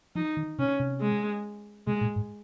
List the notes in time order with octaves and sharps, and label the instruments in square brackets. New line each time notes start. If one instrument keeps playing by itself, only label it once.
[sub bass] F3 [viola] D#4
[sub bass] D#3
[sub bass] C3 [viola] C#4
[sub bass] C3
[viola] G#3
[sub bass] C3 [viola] G#3
[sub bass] A#2
G#2